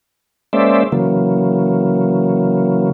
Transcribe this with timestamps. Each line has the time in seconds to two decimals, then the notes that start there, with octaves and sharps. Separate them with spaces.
0.53 G#3 A#3 C#4 C5 D5 E5
0.92 C#3 E3 F#3 A#3